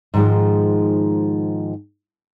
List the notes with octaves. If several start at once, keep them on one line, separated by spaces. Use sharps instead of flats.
G#2 D#3 F3 G#3